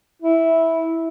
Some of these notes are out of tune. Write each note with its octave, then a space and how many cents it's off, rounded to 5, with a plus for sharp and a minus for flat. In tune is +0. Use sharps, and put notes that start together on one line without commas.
E4 -10